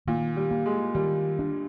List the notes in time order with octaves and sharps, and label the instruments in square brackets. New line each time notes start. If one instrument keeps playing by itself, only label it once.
[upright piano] A#2 [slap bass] D#3
[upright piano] G3
[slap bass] A#3
[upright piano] G#3
[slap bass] D#3 [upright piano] G3
[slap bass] D4